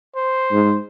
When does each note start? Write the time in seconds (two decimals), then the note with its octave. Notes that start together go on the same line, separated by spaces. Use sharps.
0.16 C5
0.52 G#2